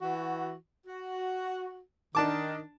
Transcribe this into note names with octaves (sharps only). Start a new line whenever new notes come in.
E3 F#4
F#4
D#3 D4 A5 D6